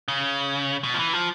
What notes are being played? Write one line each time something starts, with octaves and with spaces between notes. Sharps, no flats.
C#3
B2
F3
E3
F3